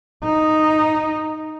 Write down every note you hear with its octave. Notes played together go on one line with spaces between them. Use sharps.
D#4